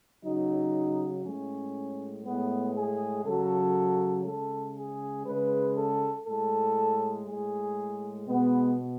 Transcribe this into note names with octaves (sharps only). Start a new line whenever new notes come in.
C#3 F#3 D#4
A2 G#3 C#4
A2 G#3 B3
G#4
C#3 F#3 A4
C#3 G#3 A4
G#4
C#3 G#3 B4
A4
A2 G#3 A4
A2 G#3 G#4
B2 G#3 B3